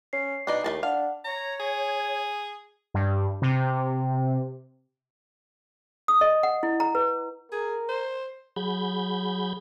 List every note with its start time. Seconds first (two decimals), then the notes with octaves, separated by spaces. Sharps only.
0.13 C#4 C7
0.47 B2 D4 D#4 D5
0.64 D#2 A3 F#4 A5
0.83 D4 F5 F#5
1.24 C#5 A#5
1.60 G#4
2.94 G2
3.42 C3
6.08 D#6
6.21 D#5
6.43 F#5
6.63 E4
6.80 A#5
6.95 B4
7.52 G#4 A#4
7.89 C5
8.56 F#3 G#4 B5 G6 G#6